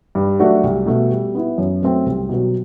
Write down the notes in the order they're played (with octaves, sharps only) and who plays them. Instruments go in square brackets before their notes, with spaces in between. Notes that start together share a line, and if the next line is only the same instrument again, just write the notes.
[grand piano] G2
F#3 A3 D4 F#4
C2
B2 A3
G3
B3 E4
F#2
F#3 A3 C4
C2
B2 F#3